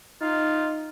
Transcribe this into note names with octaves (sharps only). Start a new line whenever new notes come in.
D#4 F4